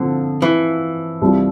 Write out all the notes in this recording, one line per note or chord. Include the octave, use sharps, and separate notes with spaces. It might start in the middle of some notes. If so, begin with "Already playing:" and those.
Already playing: A#2 D3 F3 C4 E4
E3
C2 C3 G3 D4 F4